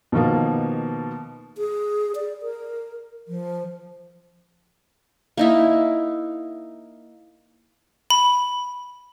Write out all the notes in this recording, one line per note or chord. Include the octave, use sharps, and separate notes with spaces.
B2 D#3 F3 A#3
G#4
D5
A#4
F3
A#3 D#4 E4
B5